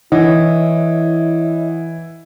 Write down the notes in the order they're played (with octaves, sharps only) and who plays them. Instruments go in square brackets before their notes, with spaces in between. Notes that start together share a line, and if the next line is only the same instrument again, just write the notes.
[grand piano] E3 [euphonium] E4 [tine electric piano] C#5 D#5 F#5